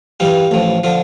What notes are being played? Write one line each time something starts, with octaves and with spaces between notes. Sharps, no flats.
G2 E3 G3 F4
A1 A2 F3
D3 F3 F4